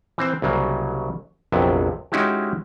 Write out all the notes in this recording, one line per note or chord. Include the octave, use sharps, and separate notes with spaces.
E3 C4 C5
C2 C#3 F#3 A#3
A#1 F2 C3 F#3 B3
G#3 C#4 D#4 E4 F#4 G4